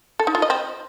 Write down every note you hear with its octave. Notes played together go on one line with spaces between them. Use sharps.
A4
D#4
F4
D#5
C4